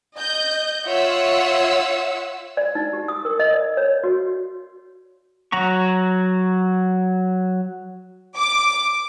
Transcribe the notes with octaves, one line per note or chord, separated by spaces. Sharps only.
D#5 G6
F4 C#5 E5 F#5 E6
D5
D#4
G4
D#6
A#4
D#5
D5
C#5
F#4
F#3 F#4 A#5 C#6
D6